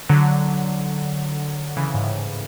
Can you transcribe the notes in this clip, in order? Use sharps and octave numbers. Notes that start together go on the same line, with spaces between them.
D3 F#3
C#3 E3
G#2
A2